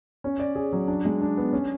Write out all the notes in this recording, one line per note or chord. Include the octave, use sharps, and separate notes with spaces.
C#4
D5
G#4
F#3
D4
G#3
D4
B3
C#4